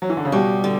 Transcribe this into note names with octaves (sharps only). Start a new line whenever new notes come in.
F#3
E3
D3
C#3
B2 G3
D3